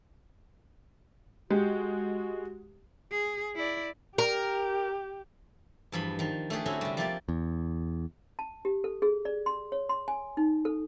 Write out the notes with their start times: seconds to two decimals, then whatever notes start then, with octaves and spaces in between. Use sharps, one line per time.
1.51 G#3 F#4 G4
3.11 G#4
3.56 E4 D5
4.18 G4 A#4
5.92 E2 G2 F3 B5
6.19 D#3 F3
6.50 A3 D4 G4 G#4
6.66 D3 C4 C#4 E4 F#4
6.81 C3 G3
6.97 F3 A#3 G4 D5
7.29 E2
8.39 A5
8.65 G4
8.84 A4
9.02 G#4
9.25 D5
9.46 C6
9.72 C#5
9.89 C6
10.08 G#5
10.37 D#4
10.65 A4